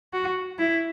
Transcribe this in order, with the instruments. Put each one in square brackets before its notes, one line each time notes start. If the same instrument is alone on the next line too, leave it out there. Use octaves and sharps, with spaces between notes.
[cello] F#4
E4